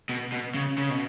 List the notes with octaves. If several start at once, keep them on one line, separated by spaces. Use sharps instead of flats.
B2
B2
C#3
C#3
B2